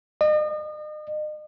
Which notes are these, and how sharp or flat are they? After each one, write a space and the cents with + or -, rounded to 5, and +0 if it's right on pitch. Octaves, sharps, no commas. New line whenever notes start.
D#5 -40